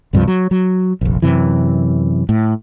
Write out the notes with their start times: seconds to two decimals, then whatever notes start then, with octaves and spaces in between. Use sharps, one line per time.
0.13 C#2 G2 C3 F3
0.28 F#3
0.51 F#3
1.01 F1 A#1
1.22 F#2 C3 E3
2.29 A2